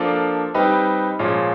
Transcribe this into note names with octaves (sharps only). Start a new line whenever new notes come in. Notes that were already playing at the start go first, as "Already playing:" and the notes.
Already playing: F3 A#3 D4 F4 A4
G3 C4 D#4 G4 B4
A#2 F3 G#3 C#4 F4